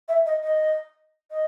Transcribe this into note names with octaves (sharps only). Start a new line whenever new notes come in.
E5
D#5
D#5
D#5